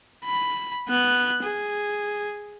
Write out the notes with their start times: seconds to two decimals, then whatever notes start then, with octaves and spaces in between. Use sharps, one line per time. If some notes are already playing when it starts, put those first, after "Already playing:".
0.25 B5
0.88 B3 F#6
1.43 G#4